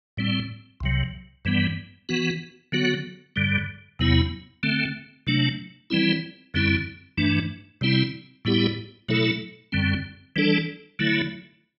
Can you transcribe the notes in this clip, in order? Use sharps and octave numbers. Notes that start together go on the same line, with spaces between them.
A2 G3 C4
C2 C3 F#3
G2 E3 G3 B3
E3 B3 F#4
D3 F#3 B3 F#4
G2 D3 G3
E2 C3 F#3 B3 E4
D3 A3 C4
C3 F#3 A3 D4
E3 G3 C4 E4
F#2 D3 G3 C4 E4
G2 E3 A3 D4
C3 G3 C4 E4
A2 G3 B3 E4 G4
B2 F#3 A3 E4 A4
F#2 D3 G3 C4
E3 G3 D4 A4
D3 F#3 A3 E4